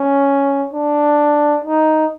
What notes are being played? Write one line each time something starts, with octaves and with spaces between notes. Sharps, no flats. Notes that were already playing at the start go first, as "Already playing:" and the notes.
Already playing: C#4
D4
D#4